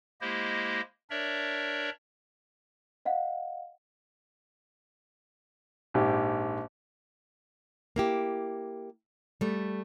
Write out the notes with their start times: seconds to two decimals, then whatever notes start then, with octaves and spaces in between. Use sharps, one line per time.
0.21 G#3 A#3 E4 G4 C5 D#5
1.10 D4 A#4 C#5 D5 E5
3.05 D#5 F5 F#5
5.94 A#1 G#2 G4
7.96 A#3 E4 G4
9.41 G3 A3